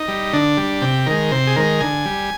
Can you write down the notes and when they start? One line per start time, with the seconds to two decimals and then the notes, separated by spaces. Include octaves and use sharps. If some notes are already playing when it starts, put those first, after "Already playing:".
Already playing: D#4
0.08 G3
0.33 D3 D4
0.57 G3
0.82 C3 G4
1.06 D#3 G#3 A#4
1.31 C3 C5
1.47 G#4
1.56 D#3 G#3 A#4
1.80 D3 G#5
2.06 G3